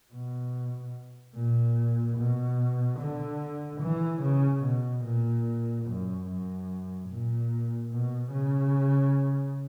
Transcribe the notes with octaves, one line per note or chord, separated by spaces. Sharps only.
B2
A#2
B2
D3
E3
C#3
B2
A#2
F#2
F#2
A#2
B2
C#3